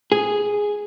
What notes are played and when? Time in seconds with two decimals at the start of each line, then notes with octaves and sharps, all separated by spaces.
0.12 G#4